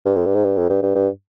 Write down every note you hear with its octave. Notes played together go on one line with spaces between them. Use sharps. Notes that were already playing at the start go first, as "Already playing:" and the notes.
G2
F2
G2
G#2
G2
F2
G2
G2
G2